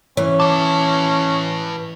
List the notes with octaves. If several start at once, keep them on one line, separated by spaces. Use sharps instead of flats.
E3 C#4 C#5
B4 A5 D6